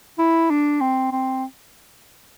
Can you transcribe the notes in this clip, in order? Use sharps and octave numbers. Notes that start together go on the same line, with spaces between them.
E4
D4
C4
C4